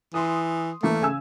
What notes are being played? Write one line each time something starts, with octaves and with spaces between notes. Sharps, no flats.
E3 C6 D#6
E3 A3 A#3
C#3 G#5 E6